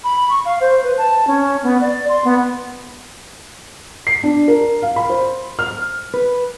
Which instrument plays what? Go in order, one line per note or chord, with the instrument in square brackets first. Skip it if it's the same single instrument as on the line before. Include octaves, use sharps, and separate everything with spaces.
[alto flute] B5
C#6
F5
C5
B4
A5
C#4
B3
D5
C6
B3
[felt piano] C7
D4
A#4
F5
B5
C5
F6
[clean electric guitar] B4